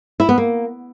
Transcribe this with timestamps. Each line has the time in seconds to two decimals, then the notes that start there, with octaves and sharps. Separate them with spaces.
0.20 E4
0.29 B3
0.38 A#3